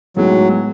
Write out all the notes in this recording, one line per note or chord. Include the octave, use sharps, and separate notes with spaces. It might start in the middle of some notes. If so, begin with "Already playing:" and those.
A2 F#3 G#3 B3 D#4